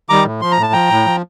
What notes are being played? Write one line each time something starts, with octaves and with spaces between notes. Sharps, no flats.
D#3 G3 A#5 D6
A2
F3 C6
A#5
A2 A5
F3 G5 A#5
A2
F3